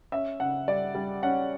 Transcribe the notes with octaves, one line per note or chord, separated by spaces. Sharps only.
C#4 E5
C#3 F#5
G3 D5
G3
C#4 F#5